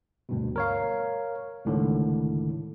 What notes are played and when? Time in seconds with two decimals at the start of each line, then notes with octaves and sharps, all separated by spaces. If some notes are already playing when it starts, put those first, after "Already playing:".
0.29 D2 G2 B2
0.56 A#4 C#5 F5
1.65 C#2 A2 D3 D#3